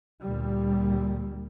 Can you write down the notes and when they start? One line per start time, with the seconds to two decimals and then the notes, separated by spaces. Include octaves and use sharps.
0.23 D2 A#2 G3